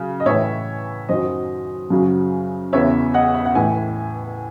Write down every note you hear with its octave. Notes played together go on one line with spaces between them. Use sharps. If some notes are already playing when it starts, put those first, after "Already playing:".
Already playing: C#3 F#3
D#5
A2 E3 C#5 E5
F#2 D#3 F#3 C5 D#5
F#2 C#3 F#3
E2 C#3 E3 C#5 E5
D#5 F#5
E5
F#5
A2 E3 E5 G#5